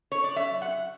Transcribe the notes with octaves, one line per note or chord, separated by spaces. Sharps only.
C#5
D5
F#2 E5
F#5